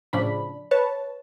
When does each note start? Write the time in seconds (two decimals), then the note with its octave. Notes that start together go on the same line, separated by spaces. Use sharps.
0.13 A2 C#3 F3 D4 B5
0.71 B4 C#5 A5